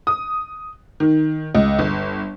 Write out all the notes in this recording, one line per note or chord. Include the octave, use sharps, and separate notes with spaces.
D#6
D#3
C#2
G1